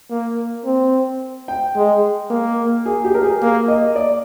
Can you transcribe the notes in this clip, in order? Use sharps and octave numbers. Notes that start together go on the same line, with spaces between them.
A#3
C4
G5
G#3
A#3
G#4
G4
A#4
G#4
A#3
D#5
D5